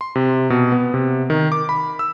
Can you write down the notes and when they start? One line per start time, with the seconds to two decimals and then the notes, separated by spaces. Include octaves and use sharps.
0.01 C6
0.15 C3
0.50 B2
0.72 B3
0.94 C3
1.30 D#3
1.52 D6
1.69 B5
1.99 E6